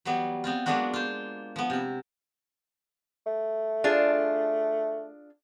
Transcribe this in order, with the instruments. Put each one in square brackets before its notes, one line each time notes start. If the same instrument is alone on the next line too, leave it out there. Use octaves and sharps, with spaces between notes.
[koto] E3 F#3 G3 B3
B3 C4 F4
F#3 G#3 A#3 B3 D4 F#4
F4 C5
F3 B3
C3 E4
[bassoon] A3
[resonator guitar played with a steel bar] D4 F4 G#4